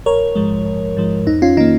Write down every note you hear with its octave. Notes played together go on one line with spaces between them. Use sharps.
A#1 A#4 C#5
G#2 F3 G#3
A#1
G#2 F3 G#3
F2 D#4
C#4 F4
D#3 A#3 D#4